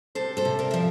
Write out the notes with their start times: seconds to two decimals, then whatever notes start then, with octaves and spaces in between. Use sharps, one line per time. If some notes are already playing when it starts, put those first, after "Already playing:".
0.15 C3 A4 C5
0.37 A4 C5
0.45 C3
0.59 A#4 D5
0.71 F3 E5